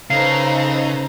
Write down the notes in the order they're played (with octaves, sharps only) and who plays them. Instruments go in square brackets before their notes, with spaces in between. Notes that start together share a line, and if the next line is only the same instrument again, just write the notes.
[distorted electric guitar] C#3 [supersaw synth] D#4 A4 B4 [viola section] C5 A#5 [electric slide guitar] F5